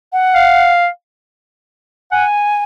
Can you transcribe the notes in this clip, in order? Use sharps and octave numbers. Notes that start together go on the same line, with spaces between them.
F#5
F5
F#5 G#5